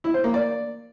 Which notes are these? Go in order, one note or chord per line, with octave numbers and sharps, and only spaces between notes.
E4
C5
A#3
D5